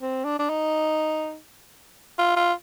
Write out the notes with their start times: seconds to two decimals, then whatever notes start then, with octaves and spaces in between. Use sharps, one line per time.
0.01 C4
0.25 D4
0.39 D4
0.49 D#4
2.18 F4
2.36 F4